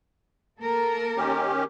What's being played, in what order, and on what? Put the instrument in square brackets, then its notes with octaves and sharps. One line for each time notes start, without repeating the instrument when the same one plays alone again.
[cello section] A#3 A4 A#4
[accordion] D#3 C#4 G4